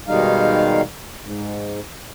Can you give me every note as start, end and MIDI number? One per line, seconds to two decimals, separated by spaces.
0.08 0.81 47
0.08 0.81 51
0.08 0.81 55
0.08 0.81 56
0.08 0.81 63
0.08 0.81 77
1.22 1.80 44